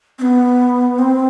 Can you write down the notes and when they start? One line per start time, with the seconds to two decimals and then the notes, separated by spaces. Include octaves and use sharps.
0.19 C4
0.22 B3
0.99 C4